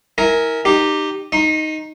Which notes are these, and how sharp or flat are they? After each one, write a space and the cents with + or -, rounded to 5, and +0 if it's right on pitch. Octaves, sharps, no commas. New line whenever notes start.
E4 -30 A#4 +0 G#5 +0
D#4 -20 G4 +0
D#4 +0 C#6 -45